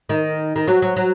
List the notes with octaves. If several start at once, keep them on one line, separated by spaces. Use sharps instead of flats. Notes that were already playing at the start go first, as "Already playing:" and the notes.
D#3
D#3
F#3
F#3
F#3